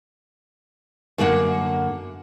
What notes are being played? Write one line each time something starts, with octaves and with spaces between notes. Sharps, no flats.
F#2 D3 A#3 F#5